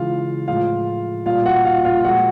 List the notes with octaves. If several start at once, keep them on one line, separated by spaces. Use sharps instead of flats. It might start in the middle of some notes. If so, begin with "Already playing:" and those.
Already playing: C#3 E3 G#3 F4 F5
A2 F3 G#3 F4 F5
A#2 G3 F4 F5
F#4 F#5
F4 F5
F4 F5
A#2 F3 G#3 F#4 F#5